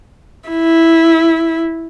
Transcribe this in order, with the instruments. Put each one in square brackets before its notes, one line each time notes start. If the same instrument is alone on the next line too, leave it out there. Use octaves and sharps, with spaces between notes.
[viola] E4